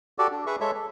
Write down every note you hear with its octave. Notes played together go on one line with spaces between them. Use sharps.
F#4 G4 A4 D5
D4
G#4 B4 E5 C#6
G#3 A4 C#5 E5
A4